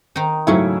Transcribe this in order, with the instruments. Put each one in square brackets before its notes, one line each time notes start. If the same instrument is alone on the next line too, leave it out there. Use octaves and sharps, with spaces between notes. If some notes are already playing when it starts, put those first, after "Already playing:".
[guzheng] D#3 D#4
[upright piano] G#2 F#3 A3 E4 [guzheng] C#3 C#4